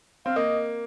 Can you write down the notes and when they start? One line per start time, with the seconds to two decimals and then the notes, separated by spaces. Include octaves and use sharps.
0.25 C4 F5
0.36 A#3 D#5